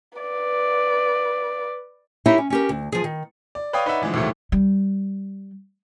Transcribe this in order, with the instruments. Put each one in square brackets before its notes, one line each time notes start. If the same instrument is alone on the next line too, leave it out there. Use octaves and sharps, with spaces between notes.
[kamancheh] B4 D5
[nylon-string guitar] D#4 E4 G4 A#4 C#5 E5
C#4
C#4 G4 A#4
D2
F3 G#4
D#3
[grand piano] D5
B4 C#5 D5 F5 G5 D#6
D#4 B4 C#5 D5 E5 F#5
D3 E3 F3 G#3
D#2 A2 C3 E3 F#3 A3
[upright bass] G3